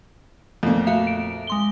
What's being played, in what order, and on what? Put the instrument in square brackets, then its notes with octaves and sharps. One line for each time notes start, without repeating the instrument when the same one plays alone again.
[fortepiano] F2 A#2 [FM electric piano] A3
[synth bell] F#4 E5 F5
D7
G#3 C6 G7